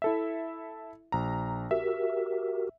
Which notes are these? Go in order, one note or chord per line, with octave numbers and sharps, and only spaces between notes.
E4 A4 E5
A#1 A#5
F#4 G4 A#4 E5